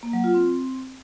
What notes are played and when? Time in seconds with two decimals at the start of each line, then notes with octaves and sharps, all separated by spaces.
0.03 A#3
0.13 F#3
0.24 F4
0.34 C4